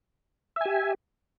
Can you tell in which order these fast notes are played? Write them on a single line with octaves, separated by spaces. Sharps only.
E5 G#5 G4